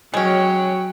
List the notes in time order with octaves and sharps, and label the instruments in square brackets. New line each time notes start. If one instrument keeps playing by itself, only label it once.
[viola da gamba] F#3 [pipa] G#3 C#4 [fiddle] G5